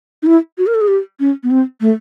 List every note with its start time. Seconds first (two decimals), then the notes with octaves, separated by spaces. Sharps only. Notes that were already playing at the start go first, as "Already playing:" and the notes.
0.22 D#4
0.26 E4
0.58 F#4
0.67 A#4
0.74 A4
0.81 G#4
0.88 G4
1.20 C#4
1.43 B3
1.50 C4
1.81 A3